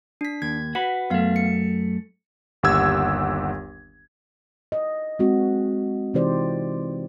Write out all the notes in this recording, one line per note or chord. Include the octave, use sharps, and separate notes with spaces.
D4 B6
D#2 G#6
F#4 B4 F#5 B5
F#2 A3 B3 F5
C#7
G1 D#2 G4 F#5 E6 G#6
D#5
G#3 C4 F#4
C3 E3 D#4 G4 C5 D5